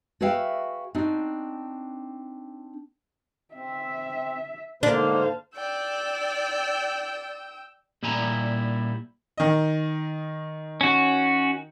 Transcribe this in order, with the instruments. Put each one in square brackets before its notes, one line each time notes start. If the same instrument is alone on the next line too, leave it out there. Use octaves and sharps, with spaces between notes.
[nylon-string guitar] F#4 G#4 B4 E5 F5 G5
C4 D4 D#4 F#4
[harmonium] C4 [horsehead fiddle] E5
[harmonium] G#2 D3 A#3 [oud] D4 [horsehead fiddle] C5 F5
[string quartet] D5 [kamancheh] G5 E6
[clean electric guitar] A#2 G3 E4 G#5 A#5
[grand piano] D#3 D#5
[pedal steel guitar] C#4 F#4